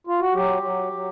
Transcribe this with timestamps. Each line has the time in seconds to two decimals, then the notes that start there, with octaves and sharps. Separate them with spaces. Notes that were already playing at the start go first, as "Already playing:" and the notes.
0.07 F4
0.20 F#4
0.34 F#3 G4
0.63 F#3
0.93 F#3